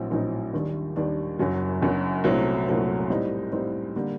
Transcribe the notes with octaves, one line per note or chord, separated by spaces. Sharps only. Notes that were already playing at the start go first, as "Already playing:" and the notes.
Already playing: A#1 A2 F#3 C4
A#1 A2 F#3 C4 D#4
D#2 D#3 G3 D4
D#2 D#3 G3 D4
F#1 F#2 F#3
F#1 F#2 F#3
C2 A#2 F#3 A3 C4
C2 A#2 F#3 A3 C4
A2 G3 C4 D#4
A2 G3 C4 D#4
D3 G3 A#3